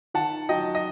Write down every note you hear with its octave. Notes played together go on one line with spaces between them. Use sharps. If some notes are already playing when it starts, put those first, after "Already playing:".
D#3 F#5 A5
F#3 D#5 G5
D#5